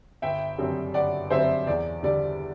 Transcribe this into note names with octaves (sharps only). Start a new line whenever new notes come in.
G1 E5 G5
F#2 D3 G3 C4
G1 D5 F#5
F#2 D3 G3 C4 C5 E5
E2 D5
D3 G3 D5